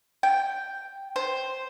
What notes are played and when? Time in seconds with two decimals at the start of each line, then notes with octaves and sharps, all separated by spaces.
0.23 G5
1.16 C5